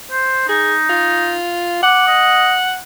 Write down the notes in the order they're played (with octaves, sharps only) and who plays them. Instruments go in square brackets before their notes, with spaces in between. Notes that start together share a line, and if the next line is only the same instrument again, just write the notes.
[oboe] C5
[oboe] D#4 [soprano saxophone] G#4
[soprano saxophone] F4
[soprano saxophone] F#5 [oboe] D6
[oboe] D#5